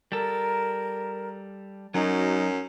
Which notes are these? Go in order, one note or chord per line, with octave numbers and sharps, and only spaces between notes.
G3 A4 A#4
F#2 F#3 D#4